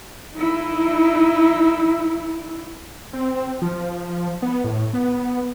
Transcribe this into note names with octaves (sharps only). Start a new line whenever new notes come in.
D#4 E4
C4
F3
B3
A2
B3